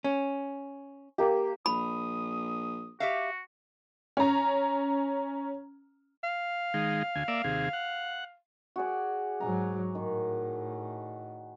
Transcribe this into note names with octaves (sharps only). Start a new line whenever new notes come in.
C#4
A#3 G4
A#1 B5 D#6
F#4 G4 E5 F5
C#4 A#5
F5
D#3 G#3
D2 G#5
A#3 D5 E5
D#2 C3 G#4
F#5
F#4 G#4 D5
G#2 F#3 G#5 A#5
A2 D#3